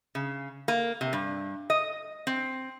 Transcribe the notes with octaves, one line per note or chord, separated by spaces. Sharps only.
C#3
A#3
C3
G2
D#5
C4